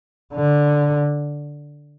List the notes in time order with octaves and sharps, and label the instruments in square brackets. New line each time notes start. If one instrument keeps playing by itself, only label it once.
[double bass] D3